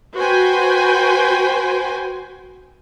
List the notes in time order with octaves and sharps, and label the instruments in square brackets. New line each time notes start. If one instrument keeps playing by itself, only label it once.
[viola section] F#4 B4 C5 G5 G#5